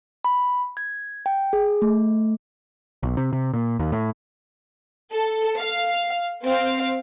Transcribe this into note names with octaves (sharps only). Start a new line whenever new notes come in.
B5
G#6
G5
G#4
A3
B1
C3
C3
A#2
D#2
A2
A4
F5
C4 F5